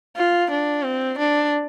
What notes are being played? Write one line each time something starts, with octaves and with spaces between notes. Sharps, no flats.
F4
D4
C4
D4